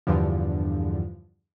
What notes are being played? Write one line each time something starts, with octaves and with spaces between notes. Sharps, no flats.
E2 G2 D3 F3